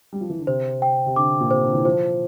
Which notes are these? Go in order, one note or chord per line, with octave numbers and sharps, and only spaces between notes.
G3
F3
E3
D3
C3 C5
G5
C3
D3 D6
A#2
C3 C5
D3
E3
F3 C5